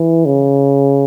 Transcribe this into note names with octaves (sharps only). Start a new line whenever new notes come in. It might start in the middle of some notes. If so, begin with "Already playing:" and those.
Already playing: E3
C#3